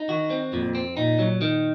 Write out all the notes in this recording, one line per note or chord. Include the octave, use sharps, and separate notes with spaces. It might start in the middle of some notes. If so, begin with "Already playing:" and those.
Already playing: D#4
D#3 F#4
C4
F2 A#2
C4
A#2 D#4
F#3
D#3